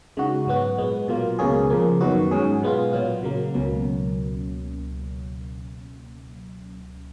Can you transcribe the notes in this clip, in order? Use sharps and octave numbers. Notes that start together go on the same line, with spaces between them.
C#3 G#3 D#4 F#4
G#2 F#3 B3 F#4
A#2 G#3 B3
B2 F#3 A#3 F4
C#2 B2 A#3 C#4 G#4
C#3 F3 A#3
F#2 D#3 F#3 B3 F#4
G#2 F#3 C#4 G#4
B2 G#3 B3 F4
A#2 F#3 B3 F4
C#3 F#3 A#3
C#2 B2 F#3 A#3 C#4